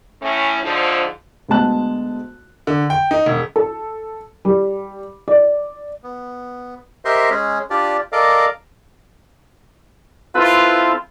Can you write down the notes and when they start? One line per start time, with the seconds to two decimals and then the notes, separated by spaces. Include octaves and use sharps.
0.22 A2 C#4
0.63 G#2 D3 F3
1.49 D2 G#3 B3 A5 F#6
2.67 D3
2.90 G5
3.11 D#4
3.26 E1
3.56 A4
4.45 G3
5.28 D5
6.04 B3
7.05 G4 A#4 C5 D#5 E5 C6
7.30 G#3 C#4 G#4
7.70 D4 F4 G4 D5
8.12 A4 A#4 D5 D#5 F5 D6
10.35 C4 E4 F4 A4 B4